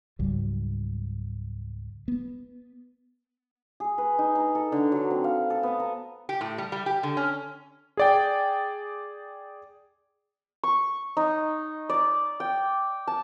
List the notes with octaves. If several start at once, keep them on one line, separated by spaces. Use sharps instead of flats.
C#2 G#2 F#3 G3
B3
G#4
B4
D#4
A#5
A4
D3
F#3
C4
F5
A4
B3
A#5
G4
A2
G3
G3
G4
D3
C#4
G#4 D5 G5
C#6
D#4
D5
G5
A5